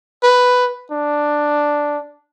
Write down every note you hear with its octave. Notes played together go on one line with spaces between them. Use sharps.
B4
D4